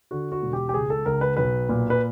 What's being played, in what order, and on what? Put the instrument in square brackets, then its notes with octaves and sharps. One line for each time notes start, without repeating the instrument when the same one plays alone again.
[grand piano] D3 F#4
F#4
E1
G4
G4
C#2 G#4
A4
C#2 A#4
B4
B1 B4
A#2
B4